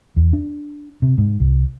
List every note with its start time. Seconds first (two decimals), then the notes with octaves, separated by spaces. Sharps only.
0.16 E2
0.33 D4
1.02 C3
1.18 G#2
1.40 C2